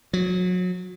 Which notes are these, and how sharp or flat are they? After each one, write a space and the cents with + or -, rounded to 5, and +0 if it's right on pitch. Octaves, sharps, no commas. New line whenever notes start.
F#3 -30